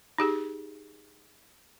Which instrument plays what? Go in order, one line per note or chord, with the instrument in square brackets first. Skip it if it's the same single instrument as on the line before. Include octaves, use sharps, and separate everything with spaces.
[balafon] D#4 G4 G#4